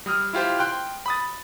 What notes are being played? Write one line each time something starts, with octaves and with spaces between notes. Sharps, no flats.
G3 D#6 F6
E4 F4 G4 C5
G5 C6 F#6
B5 D#6 A6